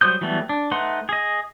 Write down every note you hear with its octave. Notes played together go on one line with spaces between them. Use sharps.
F#3 G3 C5 D#6 G6
E3 F#3 G3 A3 B3
D4
A3 D#4 B4 F#5 C6
G#4 D#5